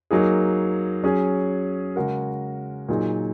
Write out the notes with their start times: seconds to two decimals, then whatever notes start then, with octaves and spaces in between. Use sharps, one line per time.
0.11 F#3 A#3 D#4 G#4
1.04 F#3 C#4 G#4
1.96 C#3 G#3 F#4 A#4
2.89 A#2 F#3 D#4 G#4